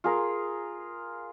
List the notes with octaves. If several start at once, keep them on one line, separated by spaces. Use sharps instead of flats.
F4 G#4 A#4